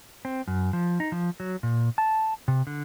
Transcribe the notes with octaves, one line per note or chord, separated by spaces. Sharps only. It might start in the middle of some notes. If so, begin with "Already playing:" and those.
C4
F#2
F3
D#4
F3
F#3
A#2
A5
C3
D3